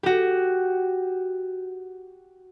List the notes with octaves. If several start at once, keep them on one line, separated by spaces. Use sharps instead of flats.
F#4 G4